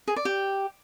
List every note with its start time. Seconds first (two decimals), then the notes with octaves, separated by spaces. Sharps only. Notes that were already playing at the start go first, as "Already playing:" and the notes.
0.08 G#4
0.16 D5
0.25 G4